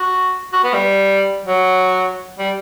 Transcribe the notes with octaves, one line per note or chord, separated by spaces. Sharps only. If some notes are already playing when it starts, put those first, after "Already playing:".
Already playing: F#4
F#4
B3
G3
F#3
G3